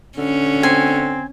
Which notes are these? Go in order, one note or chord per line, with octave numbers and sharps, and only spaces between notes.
D3 C#4
C4 G#5